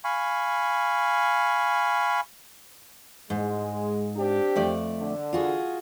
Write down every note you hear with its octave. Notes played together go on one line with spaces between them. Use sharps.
F5 G#5 B5 C#6
G#2 G#3
C4 D4 G4
F2 A3 D5
D3
F4 F#4 G#4